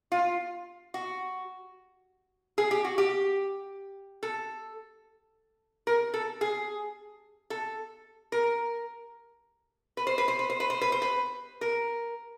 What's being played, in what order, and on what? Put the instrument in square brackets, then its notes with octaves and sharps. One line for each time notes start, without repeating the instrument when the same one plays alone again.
[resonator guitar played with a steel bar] F4
F#4
G#4
G4
F#4
G4
A4
A#4
A4
G#4
A4
A#4
B4
C5
B4
C5
B4
C5
B4
C5
B4
C5
B4
A#4